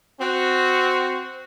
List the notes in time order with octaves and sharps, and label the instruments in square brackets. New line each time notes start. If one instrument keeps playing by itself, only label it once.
[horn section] C4 F#4